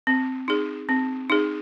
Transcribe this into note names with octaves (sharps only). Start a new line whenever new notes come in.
C4
D#4 G#4
C4
D#4 G#4